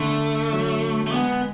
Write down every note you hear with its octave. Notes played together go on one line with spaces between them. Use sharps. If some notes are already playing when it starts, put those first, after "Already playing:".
Already playing: D3 A3
F#3
A3
G#3 B3